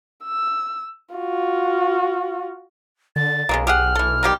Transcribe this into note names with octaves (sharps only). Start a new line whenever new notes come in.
E6
F4 F#4
D3 A6
B1 C#3 G#3 A#3
G4 G#4 F#5 F6
E3 A4
D#3 G3 G4